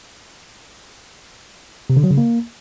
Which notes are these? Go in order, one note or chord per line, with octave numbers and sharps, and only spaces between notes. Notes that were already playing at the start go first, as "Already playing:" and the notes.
C3
D3
F#3
C#3
A#3